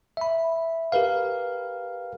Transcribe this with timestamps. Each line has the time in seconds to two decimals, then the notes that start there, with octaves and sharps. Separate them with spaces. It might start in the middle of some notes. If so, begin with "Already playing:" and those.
0.17 E5 B5
0.92 G4 A#4 B4 F5